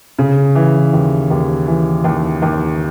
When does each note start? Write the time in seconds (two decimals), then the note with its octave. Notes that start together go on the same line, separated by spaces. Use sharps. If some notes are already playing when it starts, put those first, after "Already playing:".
0.19 C#3
0.55 E3
0.93 D#2
1.30 D#2
1.67 E3
2.04 D#2
2.42 D#2